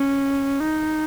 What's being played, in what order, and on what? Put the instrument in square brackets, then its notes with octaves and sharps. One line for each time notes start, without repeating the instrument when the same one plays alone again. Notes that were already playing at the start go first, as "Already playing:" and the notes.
Already playing: [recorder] C#4
D#4